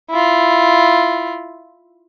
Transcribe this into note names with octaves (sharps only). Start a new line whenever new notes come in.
E4 F4